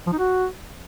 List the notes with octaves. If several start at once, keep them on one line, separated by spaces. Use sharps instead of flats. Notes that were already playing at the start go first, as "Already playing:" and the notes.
F3
D#4
F#4